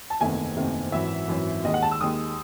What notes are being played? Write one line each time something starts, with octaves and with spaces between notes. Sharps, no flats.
A5
F#1 E2 C3 D#3 A3 G#5
F#1 E2 C3 D#3 A3
G#1 F#2 E3 E5
G#1 F#2 E3
D#2 D#3 G#3 D#5
F#5
A5
E6
D#2 D#3 G#3 D#6